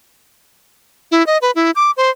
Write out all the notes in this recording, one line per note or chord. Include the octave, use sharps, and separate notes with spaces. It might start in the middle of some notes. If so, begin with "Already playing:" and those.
E4
D#5
B4
E4
D6
C5